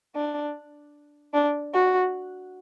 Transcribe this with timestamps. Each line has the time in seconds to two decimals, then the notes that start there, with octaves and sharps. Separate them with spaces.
0.16 D4
1.34 D4
1.73 F#4